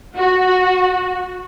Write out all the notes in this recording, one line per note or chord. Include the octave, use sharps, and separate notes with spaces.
F#4